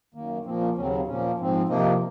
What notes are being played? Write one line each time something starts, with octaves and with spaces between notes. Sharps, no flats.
F#2 D#3 A#3
A#2 F3 A#3 C4
C#4
D#2 C#3 F#3 C4 C#4
C4
A#2 F3 A#3 C#4
G#2 F3 C4
C3 F3 A#3 D#4